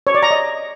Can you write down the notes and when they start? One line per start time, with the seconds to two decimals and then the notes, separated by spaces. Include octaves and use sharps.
0.07 C#5
0.15 D5
0.23 A#5
0.31 D#5